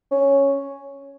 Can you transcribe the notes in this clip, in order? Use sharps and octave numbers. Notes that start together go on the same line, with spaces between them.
C#4